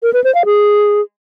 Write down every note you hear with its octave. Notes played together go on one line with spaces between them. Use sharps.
A#4
B4
C5
F5
G#4